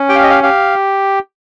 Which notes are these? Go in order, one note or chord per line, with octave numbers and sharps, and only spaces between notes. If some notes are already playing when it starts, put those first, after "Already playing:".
Already playing: C#4
G4 G5
F5
D#5
F5
G4 F5